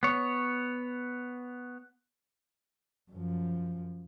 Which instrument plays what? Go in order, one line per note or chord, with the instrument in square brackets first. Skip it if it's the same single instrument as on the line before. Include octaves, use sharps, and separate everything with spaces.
[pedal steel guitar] B3 C#5
[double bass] F#2 F3